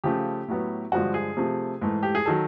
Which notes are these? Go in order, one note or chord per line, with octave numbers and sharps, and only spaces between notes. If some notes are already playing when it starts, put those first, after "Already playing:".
C#3 F3 A3 G4
A2 F#3 B3
G2 D3 F3 G#3 F#4
G#4
C3 F3 A3
G#2 E3 A3
G4
G#4
D#3 F#3 A4